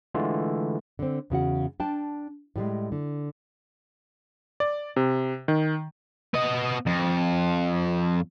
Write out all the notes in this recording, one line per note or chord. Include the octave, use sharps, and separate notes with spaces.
D3 E3 G#3 A3 F4
D3 C4
E2 C#3 F#4 F#5
D4 G5 A5
A2 G3 G#3
D3
D5
C3
D#3
B3 D#5
F2